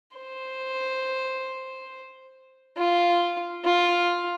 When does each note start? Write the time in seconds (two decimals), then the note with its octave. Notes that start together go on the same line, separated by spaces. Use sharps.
0.17 C5
2.77 F4
3.65 F4